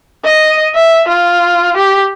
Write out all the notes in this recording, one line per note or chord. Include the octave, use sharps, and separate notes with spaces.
D#5
E5
F4
G4